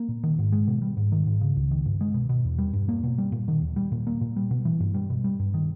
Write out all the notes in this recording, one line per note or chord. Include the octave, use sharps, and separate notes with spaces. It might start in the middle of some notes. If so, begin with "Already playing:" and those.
Already playing: A#3
A#2
D#3
G#2
G#3
B2
G3
G#2
D#3
G#2
C#3
C#2
D#3
G2
G#3
B2
B2
E2
G3
G2
A#3
B2
G3
A#2
D#3
D#2
G3
A#2
A#3
A#2
G3
B2
E3
G2
G3
B2
G3
G2
D#3